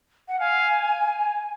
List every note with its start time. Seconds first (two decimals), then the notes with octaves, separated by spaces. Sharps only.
0.28 F#5
0.40 F5 G#5